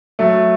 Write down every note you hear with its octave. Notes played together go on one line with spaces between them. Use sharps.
F#3 A3